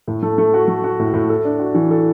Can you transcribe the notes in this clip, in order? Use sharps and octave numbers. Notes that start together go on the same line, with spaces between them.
A2
A3
A3
F#4
A3
F#4
A2
A2
A4
D4
F#4
E3
A4